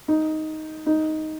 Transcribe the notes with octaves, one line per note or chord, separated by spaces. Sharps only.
D#4
D#4